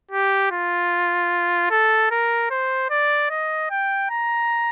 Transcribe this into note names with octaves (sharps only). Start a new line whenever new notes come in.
G4
F4
A4
A#4
C5
D5
D#5
G5
A#5